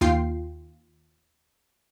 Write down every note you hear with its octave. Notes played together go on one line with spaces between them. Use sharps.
D#2 F4 G5 C7